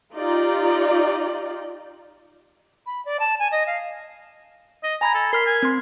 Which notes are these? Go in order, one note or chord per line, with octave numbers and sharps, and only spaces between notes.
D#4 F4 G4 D5
B5
D5
A5
G#5
D#5
F5
D#5
G#5 A#5 B5 G#6
A4
A#4 C6 F6 B6
G#5
C4 C6